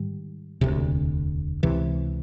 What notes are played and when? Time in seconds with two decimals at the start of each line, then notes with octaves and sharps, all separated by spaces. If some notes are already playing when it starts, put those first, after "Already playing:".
Already playing: G#2 D#3 G3
0.61 E1 D2 C3
1.63 C#2 C3 E3